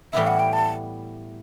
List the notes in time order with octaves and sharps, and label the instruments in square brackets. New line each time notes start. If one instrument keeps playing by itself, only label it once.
[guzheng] A2 E3 G3 B3 E4 [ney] E5
[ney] F#5
G5
A5